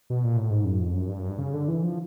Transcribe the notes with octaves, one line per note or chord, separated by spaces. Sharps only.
B2
A#2
A2
G#2
F#2
F2
F#2
G2
F#2
G2
C#3
D3
E3
F3